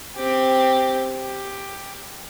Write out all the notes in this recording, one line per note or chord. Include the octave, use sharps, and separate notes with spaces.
C4 G4
G4